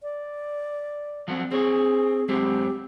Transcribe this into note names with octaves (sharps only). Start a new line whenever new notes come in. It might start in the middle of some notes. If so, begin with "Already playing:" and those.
D5
F3 F#3 C4
C4 G#4 C#5
F#2 G#3 C4 G4